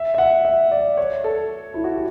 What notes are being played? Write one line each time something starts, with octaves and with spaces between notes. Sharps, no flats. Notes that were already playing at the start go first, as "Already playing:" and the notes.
Already playing: E5
E5
F#5
E5
D5
C#5
A4
E4
F#4
G4